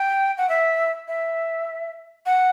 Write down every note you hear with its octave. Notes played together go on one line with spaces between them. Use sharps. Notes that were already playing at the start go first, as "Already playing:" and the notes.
Already playing: G5
F#5
E5
E5
F#5